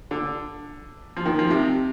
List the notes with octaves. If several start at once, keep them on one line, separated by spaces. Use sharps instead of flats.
D3
F3
D#3
F3
C3